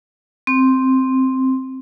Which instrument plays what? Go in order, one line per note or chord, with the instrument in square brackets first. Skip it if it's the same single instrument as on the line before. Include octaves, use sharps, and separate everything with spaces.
[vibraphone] C4